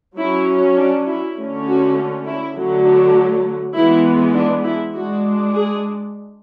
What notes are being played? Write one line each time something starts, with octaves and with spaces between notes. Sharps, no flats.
F#3 C#4 E4
D4
E4
D3 A3 C#4
F#4
E4
D3 F#3 A3
D4
E3 G#3 B3 E4
D4
E4
G#3 D4 F#4
G#4